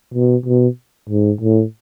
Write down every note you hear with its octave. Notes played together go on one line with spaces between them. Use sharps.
B2
B2
G#2
A2